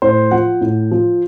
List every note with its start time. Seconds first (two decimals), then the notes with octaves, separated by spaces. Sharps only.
0.02 A2 C5
0.31 F3 F#5
0.61 A2
0.91 F3